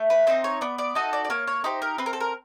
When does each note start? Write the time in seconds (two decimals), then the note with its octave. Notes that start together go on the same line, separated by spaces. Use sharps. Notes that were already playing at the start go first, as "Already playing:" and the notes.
Already playing: A3
0.10 B4
0.27 C4 D#4 C5
0.44 C#5
0.61 B3 D5
0.78 D5
0.95 D#4 F#4 A4 D#5
1.13 D5
1.24 D5
1.30 A#3 C#5
1.47 C#5
1.64 D#4 G4 C5
1.82 A#4
1.98 C4 B4
2.06 A#4
2.13 A4
2.20 A#4